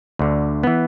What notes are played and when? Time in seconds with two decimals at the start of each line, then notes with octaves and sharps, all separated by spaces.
0.19 D2 D3
0.63 E3 B3